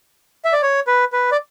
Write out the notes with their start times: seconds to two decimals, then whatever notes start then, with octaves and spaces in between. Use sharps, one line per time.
0.45 E5
0.53 D5
0.62 C#5
0.87 B4
1.12 B4
1.32 D5